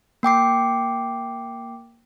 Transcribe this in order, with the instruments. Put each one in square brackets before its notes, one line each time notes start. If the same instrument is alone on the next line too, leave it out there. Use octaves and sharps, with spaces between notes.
[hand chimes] A#3 G5 D6 C7